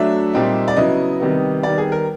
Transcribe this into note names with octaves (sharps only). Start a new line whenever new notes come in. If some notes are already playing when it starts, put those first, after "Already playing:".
Already playing: F#3 A3 D4 E5
A#2 G3 C4 D#4
D5
C#3 F#3 B3 E4 D#5
C3 D#3 G3 B3
D#3 G3 B3 D5
G#4
A#4